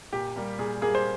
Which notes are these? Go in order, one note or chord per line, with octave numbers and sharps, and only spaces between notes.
A#2 G4
G3 A#3
A#2 G#4
G3 A#3 G#4
C5